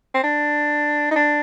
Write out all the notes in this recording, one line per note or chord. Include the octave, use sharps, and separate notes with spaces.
C4
D4
D#4
D4